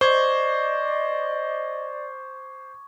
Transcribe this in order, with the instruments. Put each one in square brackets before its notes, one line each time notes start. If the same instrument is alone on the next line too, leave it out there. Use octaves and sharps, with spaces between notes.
[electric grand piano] C5 [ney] D5 [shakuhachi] D#5 [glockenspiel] C#6 D6 G#6